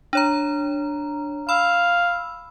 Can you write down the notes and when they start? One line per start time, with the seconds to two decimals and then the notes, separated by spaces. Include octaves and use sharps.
0.13 D4 C#5 A#5
1.49 F5 B5 E6